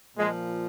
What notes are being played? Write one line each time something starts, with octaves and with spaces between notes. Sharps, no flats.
A#2 F3 G#3